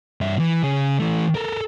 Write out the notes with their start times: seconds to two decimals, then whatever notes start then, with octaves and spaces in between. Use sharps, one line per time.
0.21 G2 E5
0.39 E3
0.63 C#3 G#4
0.99 E3 A3
1.35 A4 A#4